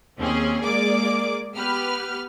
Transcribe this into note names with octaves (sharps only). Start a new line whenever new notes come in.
D#2 C4 C#4 G#4
G#3 A#3 G#4 D5 D6
B3 G4 B4 F6